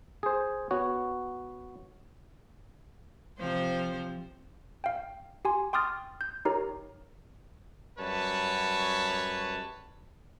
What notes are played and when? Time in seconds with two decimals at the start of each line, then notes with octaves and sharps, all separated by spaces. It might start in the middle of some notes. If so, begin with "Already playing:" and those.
0.23 G#4 C5
0.71 B3 F#4 C#5
3.40 C3 F3 C5
4.84 F5 G5
5.45 G4 G#5 C6
5.73 G5 C6 D6 D#6 F6 A6
6.21 G6
6.45 D#4 G4 A#4 C#5 A#5
7.99 F#2 G3 B4 C#5 A5